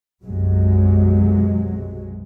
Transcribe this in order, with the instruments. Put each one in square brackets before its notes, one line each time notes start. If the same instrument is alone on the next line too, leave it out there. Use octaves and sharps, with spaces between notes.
[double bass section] B1 F#2 C3 F#3 G#3